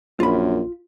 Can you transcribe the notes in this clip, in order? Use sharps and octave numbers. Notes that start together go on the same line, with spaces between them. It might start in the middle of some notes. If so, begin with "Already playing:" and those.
A#1 F#2 F4 B5